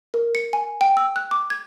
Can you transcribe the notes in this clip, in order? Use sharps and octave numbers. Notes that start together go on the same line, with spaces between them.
A#4
C#7
G#5
G5
E6
F#6
D6
G#6